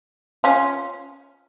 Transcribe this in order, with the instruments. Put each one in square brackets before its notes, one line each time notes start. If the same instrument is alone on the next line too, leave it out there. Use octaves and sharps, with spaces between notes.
[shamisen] C#4 F4